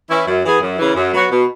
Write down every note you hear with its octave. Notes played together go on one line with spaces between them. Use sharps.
E3 C#4 E4
F#2
E3 B3 G#4
F#2
C#3 E3
F#2
F#3 B3 F#4
B2